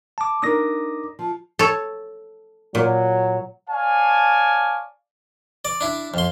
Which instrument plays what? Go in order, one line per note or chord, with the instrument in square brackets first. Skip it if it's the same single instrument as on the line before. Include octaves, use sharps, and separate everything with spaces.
[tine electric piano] A5 D6
[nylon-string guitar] D4 D#4 A#4 [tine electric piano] D6 D#6 A#6
[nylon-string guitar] F3
[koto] A4 C#5
[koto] A#2 [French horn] F#3
[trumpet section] C#5 D5 F5 G#5 A5
[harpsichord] D5
D4 E4
F2 C6